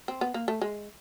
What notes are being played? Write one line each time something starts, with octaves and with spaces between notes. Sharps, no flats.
C4
B3
A#3
A3
G#3